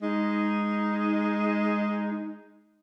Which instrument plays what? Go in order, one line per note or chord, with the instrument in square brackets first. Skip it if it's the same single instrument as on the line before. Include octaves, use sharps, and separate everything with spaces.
[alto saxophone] G#3 [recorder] D#4